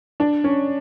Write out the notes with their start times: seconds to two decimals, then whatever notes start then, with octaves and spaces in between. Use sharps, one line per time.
0.20 D4
0.44 C#4